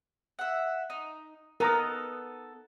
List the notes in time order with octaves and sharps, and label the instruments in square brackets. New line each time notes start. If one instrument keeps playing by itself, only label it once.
[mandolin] E5 F#5
D#4
[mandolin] B3 D#4 A4 [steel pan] A#4 A#5 D#6